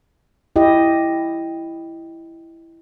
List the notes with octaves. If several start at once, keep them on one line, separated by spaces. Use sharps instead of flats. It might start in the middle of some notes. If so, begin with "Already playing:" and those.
E4 G4 D#5